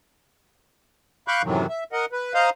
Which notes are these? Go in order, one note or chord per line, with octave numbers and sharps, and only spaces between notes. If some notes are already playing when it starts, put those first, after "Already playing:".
F5 B5 C#6 D6 F#6 G6
F#2 A2 C3 D#3 E3 F#3
E5
A#4 D#5 F#5
B4
C5 D#5 F5 A#5